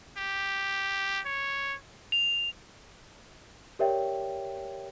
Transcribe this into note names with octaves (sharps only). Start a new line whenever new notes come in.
G4
C#5
F7
G4 A#4 C#5 D5 E5 G5